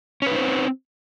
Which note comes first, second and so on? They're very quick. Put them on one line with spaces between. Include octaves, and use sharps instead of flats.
C#4 B4 D#4 C5 C4